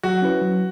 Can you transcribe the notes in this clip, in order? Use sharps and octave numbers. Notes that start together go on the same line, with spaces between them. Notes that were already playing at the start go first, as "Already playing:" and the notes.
F#3 F#4
C#4 E4 B4
F#3